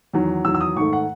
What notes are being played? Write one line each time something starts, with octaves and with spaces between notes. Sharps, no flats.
E2 D#3 F#3
E2 D#3 F#3 E6
E6
D#6
G#2 D#3 A3 C#6
F#5